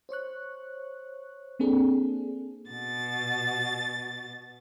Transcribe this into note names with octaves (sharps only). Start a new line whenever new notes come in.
C5 C#5 C#6 F#6
A#3 C4 D4 G#4 A4
B2 A6